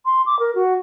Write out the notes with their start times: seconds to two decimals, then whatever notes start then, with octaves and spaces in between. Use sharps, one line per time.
0.05 C6
0.26 D6
0.39 A#4
0.55 F#4